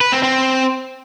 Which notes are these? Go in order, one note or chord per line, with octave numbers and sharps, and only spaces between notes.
B4
C4
C4